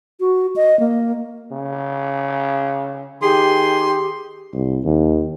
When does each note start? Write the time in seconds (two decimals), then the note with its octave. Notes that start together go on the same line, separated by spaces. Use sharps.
0.20 F#4
0.56 D#5
0.80 A#3
1.52 C#3
3.22 D#3 G4 G#4 C6
4.53 C2
4.85 D#2